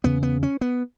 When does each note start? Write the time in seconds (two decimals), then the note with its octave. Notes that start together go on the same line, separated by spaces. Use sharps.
0.04 E2 C#3 B3
0.23 B3
0.43 C#4
0.61 B3